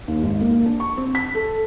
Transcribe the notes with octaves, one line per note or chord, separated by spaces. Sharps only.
D#2
G#1
A#3
D4
C#6
C4
B6
A4